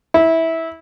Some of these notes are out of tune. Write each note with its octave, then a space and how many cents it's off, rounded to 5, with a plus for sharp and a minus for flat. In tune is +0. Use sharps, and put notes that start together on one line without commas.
E4 -15